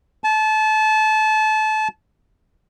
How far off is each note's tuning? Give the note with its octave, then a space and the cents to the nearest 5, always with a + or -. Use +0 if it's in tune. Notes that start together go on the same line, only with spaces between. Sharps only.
A5 -25